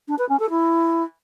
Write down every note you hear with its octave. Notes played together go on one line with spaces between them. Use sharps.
D4
B4
C#4
A4
E4